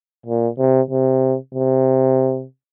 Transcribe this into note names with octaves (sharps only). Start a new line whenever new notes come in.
A#2
C3
C3
C3